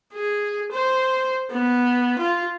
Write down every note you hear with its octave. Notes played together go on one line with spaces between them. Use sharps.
G#4
C5
B3
F4